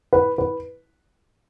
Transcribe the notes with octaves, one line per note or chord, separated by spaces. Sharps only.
B4
B4